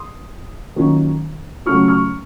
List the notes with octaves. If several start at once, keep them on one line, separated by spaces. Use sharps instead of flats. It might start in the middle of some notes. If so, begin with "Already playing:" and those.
Already playing: C6 D#6
D#3 F#3 A#3 C#4 F4
C#3 F#3 A3 C#4 F4 C#6 F6
C#6 F6